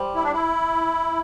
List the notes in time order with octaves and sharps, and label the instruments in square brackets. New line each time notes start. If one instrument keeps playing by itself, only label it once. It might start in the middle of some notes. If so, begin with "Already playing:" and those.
Already playing: [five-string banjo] G3 C5
[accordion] E4
D4
E4